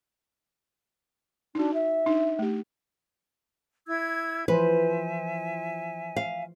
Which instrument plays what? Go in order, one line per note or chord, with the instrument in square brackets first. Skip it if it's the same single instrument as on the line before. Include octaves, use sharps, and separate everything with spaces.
[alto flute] D4 [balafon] D#4 F#4
[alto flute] E5
[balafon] D4 D#4
A3 G4
[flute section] E4 E6 G#6
[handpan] E3 F3 C5 [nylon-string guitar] B4 [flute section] E5 G#5
[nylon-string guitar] F5